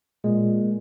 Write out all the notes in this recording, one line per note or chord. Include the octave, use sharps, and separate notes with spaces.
A#2 G#3